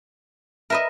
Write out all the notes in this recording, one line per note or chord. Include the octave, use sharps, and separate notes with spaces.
A#4 B4 D#5 E5